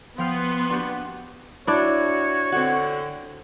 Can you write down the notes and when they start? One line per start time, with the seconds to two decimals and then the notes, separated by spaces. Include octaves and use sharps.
0.18 F3 B3 G5 C6 F6
0.70 D4 F#4 G4
1.67 D4 E4 F#4 C#5
2.52 D3 C4 F#4